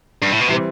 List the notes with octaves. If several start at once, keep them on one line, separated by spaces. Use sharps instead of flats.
G2
A2
B2
C3 E3 G3 C4